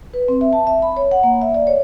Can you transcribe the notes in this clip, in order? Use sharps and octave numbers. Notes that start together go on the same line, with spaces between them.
B4
C4
E5
A5
E5
B5
C#5
F#5
A#3
E5
D5
C#5